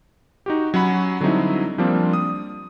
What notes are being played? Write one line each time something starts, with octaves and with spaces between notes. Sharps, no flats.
D#4 F#4 G4
F#3 C#4 F#5 B5
D3 F#3 G3 C4 D#4 E4
F3 G3 A#3 C4 D4 F4
D#6